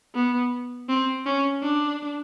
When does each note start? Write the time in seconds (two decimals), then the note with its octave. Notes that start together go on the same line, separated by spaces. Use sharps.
0.15 B3
0.89 C4
1.26 C#4
1.63 D4